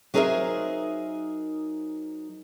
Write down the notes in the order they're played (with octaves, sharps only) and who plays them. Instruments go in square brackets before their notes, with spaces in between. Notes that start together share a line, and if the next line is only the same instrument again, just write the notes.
[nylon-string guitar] F#3 D#4 G#4 A#4 C5 E5